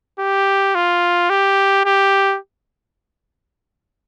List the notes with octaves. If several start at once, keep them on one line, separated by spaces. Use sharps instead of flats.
G4
F4
G4
G4